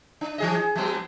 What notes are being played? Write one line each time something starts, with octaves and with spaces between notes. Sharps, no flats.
D4
E3 G#4 D#5
G#4
F3 G#3 B3